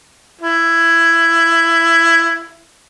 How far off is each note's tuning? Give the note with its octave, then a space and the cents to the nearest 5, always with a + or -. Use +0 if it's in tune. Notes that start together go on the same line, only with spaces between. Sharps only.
E4 +15